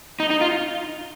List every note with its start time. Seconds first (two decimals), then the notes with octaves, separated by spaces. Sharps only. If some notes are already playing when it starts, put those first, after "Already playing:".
0.20 D#4
0.30 D#4
0.41 F4